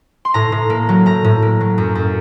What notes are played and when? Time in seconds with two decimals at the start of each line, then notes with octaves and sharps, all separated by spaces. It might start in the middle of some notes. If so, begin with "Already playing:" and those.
0.25 C6
0.34 A2 A#5
0.52 A2
0.70 A#3
0.89 F#3
1.06 A2 A#5
1.24 A2
1.42 A#3
1.61 F#3
1.78 F#2
1.95 F#2